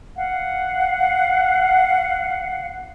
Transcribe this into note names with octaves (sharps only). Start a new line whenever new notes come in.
F5 F#5